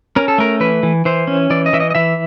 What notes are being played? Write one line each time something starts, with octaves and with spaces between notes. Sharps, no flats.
C#4 A#4
A4
A3 A#4
E3 B4
E3
E3 C5
C#4
E3 D5
D#5
E3 E5
D#5
D#5
E3 E5